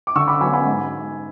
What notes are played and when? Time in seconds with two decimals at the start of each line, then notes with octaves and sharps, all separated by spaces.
0.07 D6
0.16 D3 C#6 E6
0.28 B5 D6
0.41 F#3 G#5 B5
0.45 B3
0.53 G#5 B5
0.66 G#2